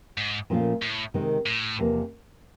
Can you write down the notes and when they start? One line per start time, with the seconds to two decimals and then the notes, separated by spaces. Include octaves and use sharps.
0.18 G#2
0.50 A#2 F3 A3 C#4 F4
0.82 A2
1.14 C3 D#3 G#3 C4 D#4
1.46 A2
1.79 E2 C3 F3 A#3